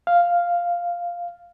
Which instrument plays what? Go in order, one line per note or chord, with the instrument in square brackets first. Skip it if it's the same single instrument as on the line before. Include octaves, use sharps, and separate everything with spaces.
[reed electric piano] F5